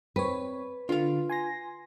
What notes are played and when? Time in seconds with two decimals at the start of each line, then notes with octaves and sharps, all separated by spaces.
0.16 C4 B4 C#5
0.89 D3 F4 F5
1.29 G#5 C6 A#6